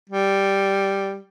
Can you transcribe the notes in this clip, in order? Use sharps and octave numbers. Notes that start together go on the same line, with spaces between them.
G3